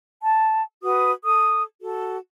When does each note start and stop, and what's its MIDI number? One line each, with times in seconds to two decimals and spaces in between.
0.21 0.62 81
0.82 1.11 66
0.82 1.11 71
0.82 1.11 87
1.23 1.62 69
1.23 1.62 87
1.82 2.17 66
1.82 2.17 69